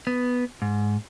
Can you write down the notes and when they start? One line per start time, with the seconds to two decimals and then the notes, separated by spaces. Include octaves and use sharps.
0.07 B3
0.62 G#2